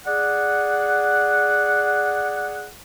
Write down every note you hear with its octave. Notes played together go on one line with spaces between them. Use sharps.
G#4 D5 F#5